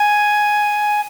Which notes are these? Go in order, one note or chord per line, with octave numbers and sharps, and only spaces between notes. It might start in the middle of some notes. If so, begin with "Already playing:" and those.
Already playing: G#5